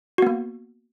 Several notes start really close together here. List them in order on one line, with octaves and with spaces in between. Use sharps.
F#4 B3 A#3